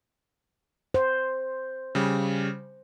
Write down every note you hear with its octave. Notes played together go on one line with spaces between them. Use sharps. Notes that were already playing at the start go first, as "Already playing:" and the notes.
C5
C#3 G3